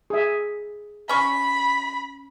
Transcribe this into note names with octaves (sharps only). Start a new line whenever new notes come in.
G#4 E5
C#4 B5 C#6